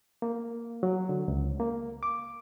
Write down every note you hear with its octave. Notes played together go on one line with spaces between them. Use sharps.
A#3
F#3
D3
C#2
A#3
D6